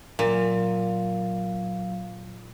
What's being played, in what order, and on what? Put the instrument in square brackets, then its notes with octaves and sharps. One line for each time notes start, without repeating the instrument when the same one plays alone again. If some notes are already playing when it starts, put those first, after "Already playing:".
[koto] A#2 [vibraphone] F#3 F5